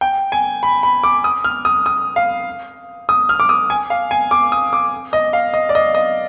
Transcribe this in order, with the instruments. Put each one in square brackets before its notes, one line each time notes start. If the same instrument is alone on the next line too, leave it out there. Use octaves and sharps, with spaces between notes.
[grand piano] G5
G#5
B5
B5
D6
D#6
F6
D#6
D#6
F5
D#6
F6
D6
D#6
G#5
F5
G#5
D6
D#6
D6
D#5
F5
D#5
D5
D#5
D#5